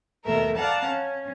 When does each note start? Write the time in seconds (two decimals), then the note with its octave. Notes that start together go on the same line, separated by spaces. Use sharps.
0.23 D#2 B2 A3 A#4 E5
0.56 D5 F5 F#5 A5 A#5
0.86 C#4